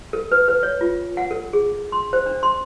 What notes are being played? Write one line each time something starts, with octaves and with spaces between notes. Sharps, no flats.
A4
B4
B4
C#5
F4
F#5
A4
G#4
C6
C5
D4
C6